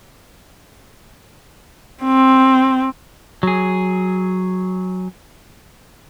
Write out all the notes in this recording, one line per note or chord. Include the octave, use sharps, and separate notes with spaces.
C4
F#3 G#4